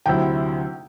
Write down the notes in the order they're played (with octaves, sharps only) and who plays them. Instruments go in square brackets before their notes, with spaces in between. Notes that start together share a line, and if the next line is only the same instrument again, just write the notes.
[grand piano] D2 C3 F#3 C4 E4 [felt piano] G5